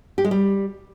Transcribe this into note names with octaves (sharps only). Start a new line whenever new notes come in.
G4
G#3
G3